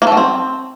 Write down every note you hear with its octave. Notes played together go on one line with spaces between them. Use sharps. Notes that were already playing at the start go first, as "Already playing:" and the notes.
A#3
A3
F#3
C4